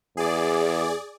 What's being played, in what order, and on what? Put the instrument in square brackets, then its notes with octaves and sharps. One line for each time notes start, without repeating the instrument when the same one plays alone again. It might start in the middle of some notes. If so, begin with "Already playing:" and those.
[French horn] E2 [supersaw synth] G#4 D5